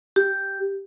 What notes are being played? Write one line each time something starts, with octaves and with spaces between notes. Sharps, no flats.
G4